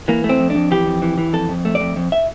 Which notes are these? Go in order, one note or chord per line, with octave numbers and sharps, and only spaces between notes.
E3 A#3
A3
C4
F2
D4
F2
E3 G4
F2
E3
E3
F2 A4
F2
A3
D5
F2
F2
E5